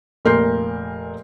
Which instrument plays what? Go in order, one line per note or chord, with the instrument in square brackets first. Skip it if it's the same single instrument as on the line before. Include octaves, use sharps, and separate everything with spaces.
[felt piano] F1 A#2 A#4 C6 G6 C7